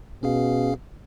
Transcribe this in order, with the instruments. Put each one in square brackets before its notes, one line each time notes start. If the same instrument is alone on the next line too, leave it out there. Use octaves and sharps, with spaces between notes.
[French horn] B2 [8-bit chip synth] C#4 G#4 F5